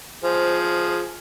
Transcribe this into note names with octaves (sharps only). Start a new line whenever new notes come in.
F3 G#4 C5